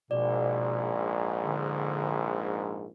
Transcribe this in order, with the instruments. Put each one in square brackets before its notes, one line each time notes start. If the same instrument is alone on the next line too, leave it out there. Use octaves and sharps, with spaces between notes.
[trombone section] A#1 G#2 [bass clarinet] B2 [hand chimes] D5
[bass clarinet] D3